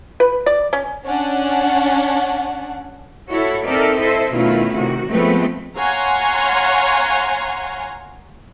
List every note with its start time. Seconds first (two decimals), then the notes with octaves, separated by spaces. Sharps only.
0.20 B4
0.46 D5
0.73 C#4
1.04 C#4 D4 F#5
3.30 E4 F#4 A4 C#5
3.65 C4 D#4 A4 A#4 D5 E5
3.97 E4 A4 C5 D#5 E5
4.32 B2 D#3 A3 C#4 E4 F4
4.75 C3 D#3 F#4
5.10 F3 G#3 A3 B3 C4 B4
5.76 C#5 F5 F#5 G#5 A#5 C6